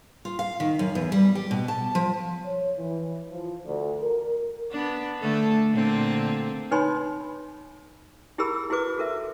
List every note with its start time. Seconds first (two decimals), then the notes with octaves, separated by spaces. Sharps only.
0.25 F4
0.39 F5
0.60 D#3
0.79 F#2
0.95 E2
1.12 G3
1.35 G4
1.51 B2
1.68 A5
1.95 F3
2.45 C#5
2.78 E3
3.31 F3
3.66 D2
4.02 A#4
4.71 B3 D4
5.20 D3 A3 A4
5.71 A#2 D3 C4
6.71 D#4 B4 C#5 G#5 B5 C6
8.38 E4 G4 G#4 A#4 B5 E6
8.70 E4 F#4 G#4 B4 D6
8.98 F#4 A4 A#4 E5